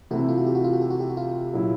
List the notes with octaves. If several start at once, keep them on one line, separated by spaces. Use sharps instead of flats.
C3 E3 A3 C4 E4 F#4
F4
F#4
G4
F#4
F4
F#4
G4
F#4
G4
F#4
F4
A#2 F#3 A#3 C#4 E4